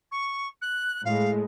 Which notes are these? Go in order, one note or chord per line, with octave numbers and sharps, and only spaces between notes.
C#6
F#6
A2 G#3 F5